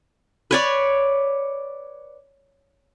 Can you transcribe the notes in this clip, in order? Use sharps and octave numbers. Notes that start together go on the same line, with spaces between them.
B4 C#5 D5